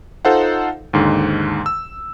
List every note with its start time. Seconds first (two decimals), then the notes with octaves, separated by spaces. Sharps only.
0.25 D#4 F4 A4 C5 F5 F#5
0.93 D#2 G#2 D3
1.66 E6